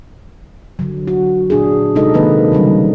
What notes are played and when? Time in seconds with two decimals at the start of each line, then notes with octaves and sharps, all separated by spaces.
0.79 D3 F#3
1.08 F#4
1.50 A#2 D4 G#4
1.95 C3 G#3 D#4 A4 D#5
2.14 D#3 F#3 A#3 C4 B4
2.52 C#3 E3 G3 C#4